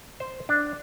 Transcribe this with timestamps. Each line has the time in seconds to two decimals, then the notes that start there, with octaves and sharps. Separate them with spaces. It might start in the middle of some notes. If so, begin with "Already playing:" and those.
0.20 C5
0.49 D4